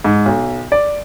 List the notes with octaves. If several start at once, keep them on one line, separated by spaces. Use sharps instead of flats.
G#2
B1
D5